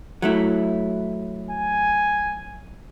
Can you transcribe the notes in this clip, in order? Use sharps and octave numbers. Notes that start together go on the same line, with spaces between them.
F#3 A3 E4
G#5